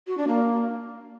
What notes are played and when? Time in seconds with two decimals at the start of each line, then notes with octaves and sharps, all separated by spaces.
0.07 F#4
0.18 D4
0.28 A#3